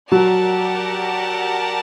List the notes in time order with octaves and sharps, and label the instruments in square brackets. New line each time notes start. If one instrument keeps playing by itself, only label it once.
[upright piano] F#3 [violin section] G4 A#4 D5 F#5 A5